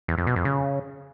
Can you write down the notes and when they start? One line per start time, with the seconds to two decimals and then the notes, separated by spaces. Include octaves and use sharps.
0.08 E2
0.18 F2
0.27 B2
0.36 F2
0.45 C#3